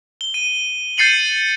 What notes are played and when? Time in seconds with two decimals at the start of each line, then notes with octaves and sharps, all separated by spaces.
0.21 G7
0.34 D#7
0.98 G6 A6 C7 C#7 D#7 F#7